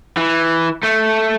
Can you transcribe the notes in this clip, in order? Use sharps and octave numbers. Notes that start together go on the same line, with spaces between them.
E3
A3